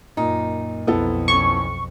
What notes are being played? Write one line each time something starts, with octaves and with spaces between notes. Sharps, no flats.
F#2 A#2 D#4
B1 F2 B3 E4 A4
E3 C#4 C#6